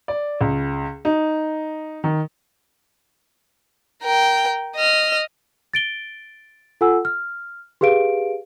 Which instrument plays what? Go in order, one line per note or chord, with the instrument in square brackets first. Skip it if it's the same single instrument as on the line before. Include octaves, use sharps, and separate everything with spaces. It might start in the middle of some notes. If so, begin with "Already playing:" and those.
[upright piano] D5
C#2
D#4
D#3
[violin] A#4 G5
D#5 F6
[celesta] A6 D7 G7
F4 A4 F#5 G#5 E6
F6
G4 G#4 B4 F5 D7